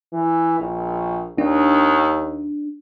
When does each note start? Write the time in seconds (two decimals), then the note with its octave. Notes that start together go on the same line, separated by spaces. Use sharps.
0.13 E3
0.60 A#1
1.38 D#2 D4